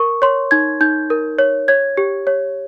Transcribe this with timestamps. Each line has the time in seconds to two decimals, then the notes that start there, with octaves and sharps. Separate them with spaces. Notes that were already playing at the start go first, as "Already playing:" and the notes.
Already playing: A#4 C#6
0.22 C#5 C6
0.51 D#4 G#6
0.81 D#4 G6
1.10 A#4
1.39 C#5
1.68 C#5 G#6
1.97 G4
2.27 C#5